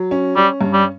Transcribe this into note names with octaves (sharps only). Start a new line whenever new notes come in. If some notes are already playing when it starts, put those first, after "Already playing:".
Already playing: F#3
C#4
G3 C#4
G2
G3